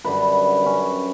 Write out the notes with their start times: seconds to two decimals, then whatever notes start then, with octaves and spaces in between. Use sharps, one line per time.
0.04 F#2 D3 G3 B4
0.66 C#4